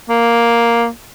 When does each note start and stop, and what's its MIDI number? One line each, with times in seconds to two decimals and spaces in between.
0.09 0.87 58